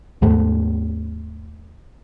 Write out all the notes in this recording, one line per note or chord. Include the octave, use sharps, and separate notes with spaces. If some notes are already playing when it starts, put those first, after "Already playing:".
D#2 G#2 A3